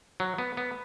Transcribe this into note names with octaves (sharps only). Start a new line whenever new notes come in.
F#3
B3
B3